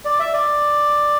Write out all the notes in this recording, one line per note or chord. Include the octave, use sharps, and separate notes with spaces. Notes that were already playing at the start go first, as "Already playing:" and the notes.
D5
E5
D5